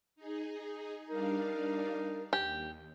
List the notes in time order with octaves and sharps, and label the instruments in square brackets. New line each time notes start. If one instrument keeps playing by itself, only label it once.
[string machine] D#4 G#4
[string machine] G3 D4 F5 [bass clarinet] D#4 [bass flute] A#4
[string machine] D#2 [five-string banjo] G4